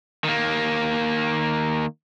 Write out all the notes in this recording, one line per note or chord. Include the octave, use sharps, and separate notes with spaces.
D#3 A#3